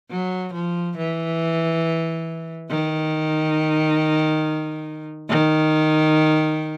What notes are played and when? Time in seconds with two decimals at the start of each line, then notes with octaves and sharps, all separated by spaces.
0.11 F#3
0.53 F3
0.97 E3
2.70 D#3
5.29 D#3